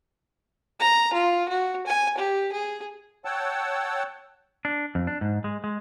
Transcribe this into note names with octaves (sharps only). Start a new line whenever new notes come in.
A#5
F4
F#4
G#5
G4
G#4
C#5 F#5 G5 A5 E6
D4
F2
D4
G#2
G#3
G#3